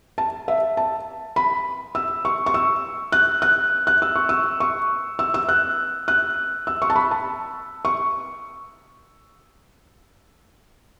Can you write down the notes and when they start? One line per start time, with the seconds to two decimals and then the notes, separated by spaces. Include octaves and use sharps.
0.18 A5
0.48 E5
0.77 A5
1.36 B5
1.95 E6
2.25 C#6
2.46 C#6
2.54 E6
3.12 F#6
3.42 F#6
3.87 F#6
4.02 E6
4.16 C#6
4.29 E6
4.60 C#6
5.19 E6
5.34 E6
5.49 F#6
6.08 F#6
6.67 E6
6.82 C#6
6.90 A5
6.96 B5
7.11 A5
7.85 C#6